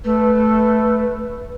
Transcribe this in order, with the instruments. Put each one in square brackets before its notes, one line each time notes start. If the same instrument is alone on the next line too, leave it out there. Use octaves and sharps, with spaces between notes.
[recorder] A3 [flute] B4